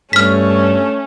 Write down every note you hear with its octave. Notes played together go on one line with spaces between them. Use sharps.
G2 A3 C#4 F6 B6